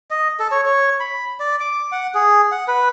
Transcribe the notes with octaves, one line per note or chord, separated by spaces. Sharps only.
D#5
A4
C#5
C#5
B5
D5
D6
F#5
G#4
F#5
B4